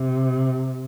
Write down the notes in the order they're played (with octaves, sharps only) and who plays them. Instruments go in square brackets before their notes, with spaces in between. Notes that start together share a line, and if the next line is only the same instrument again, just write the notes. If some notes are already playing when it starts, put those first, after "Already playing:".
Already playing: [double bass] C3